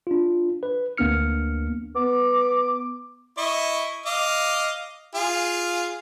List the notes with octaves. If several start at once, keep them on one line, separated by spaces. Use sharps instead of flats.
D4 F4
B4
D2 A#3 B3 D4 F6 C#7
B3 D6
E4 D#5 C#6
D#5 F5 D6
F4 G#4 F5